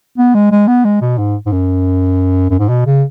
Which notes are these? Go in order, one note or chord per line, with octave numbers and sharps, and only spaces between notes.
B3
G#3
G#3
B3
G#3
B2
G#2
G#2
F#2
F#2
G#2
B2
C#3